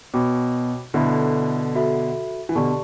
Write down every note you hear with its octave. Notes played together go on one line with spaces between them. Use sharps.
B2 F#4 C#5 G5 B5 D6
B2 D3 E4 A4 E5 B5
F#4 A4 E5 B5
E3
B2 D3 G4 D5 A5 C#6